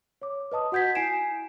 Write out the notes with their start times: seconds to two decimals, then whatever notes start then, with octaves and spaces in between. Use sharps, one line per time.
0.22 C#5 D6
0.52 B4 D#5 A5 D#6
0.72 F#4 F#5 G6 G#6 B6
0.95 E4 G#5 C7 D7 E7